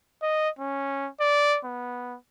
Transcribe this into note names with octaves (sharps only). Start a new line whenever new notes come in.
D#5
C#4
D5
B3